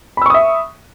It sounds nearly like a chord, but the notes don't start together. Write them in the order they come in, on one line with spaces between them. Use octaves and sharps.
B5 E6 C#6 D#6 E5